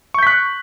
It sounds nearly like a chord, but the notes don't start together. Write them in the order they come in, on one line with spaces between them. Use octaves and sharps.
C#6 G6 B6 F#6